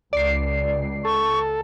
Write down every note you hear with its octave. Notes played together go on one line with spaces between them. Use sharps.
C#2 D5 C7
A4 C#6